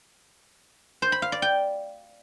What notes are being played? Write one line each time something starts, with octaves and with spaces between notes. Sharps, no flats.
C5
B5
F5
D5
G5